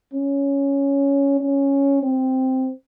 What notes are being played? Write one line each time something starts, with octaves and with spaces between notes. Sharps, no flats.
C#4
C#4
C4